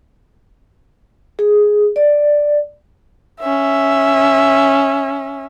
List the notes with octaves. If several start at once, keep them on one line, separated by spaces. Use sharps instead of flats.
G#4
D5
C#4 E5